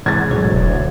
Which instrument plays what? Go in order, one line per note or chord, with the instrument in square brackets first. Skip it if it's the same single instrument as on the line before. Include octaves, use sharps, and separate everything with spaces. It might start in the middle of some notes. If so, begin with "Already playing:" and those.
[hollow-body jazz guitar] G#2 C3 E3 [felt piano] G#6 A6
[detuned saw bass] D2 [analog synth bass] B2 [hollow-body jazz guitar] F#3 C#5
[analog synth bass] E1